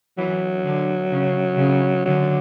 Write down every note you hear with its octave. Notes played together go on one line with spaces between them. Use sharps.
E3 F#3
D3
C#3
C#3
D3 F#3